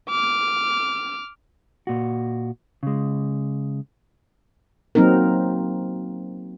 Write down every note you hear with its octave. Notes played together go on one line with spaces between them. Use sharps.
D6 F6
A#2 F#4
C#3 G#3
F#3 A#3 C4 D#4 A#4